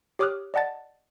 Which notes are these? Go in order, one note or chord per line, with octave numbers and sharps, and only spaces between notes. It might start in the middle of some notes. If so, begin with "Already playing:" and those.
G4 C#5 D6 D#6 F6 F#6
D5 D#5 F#5 A5 A6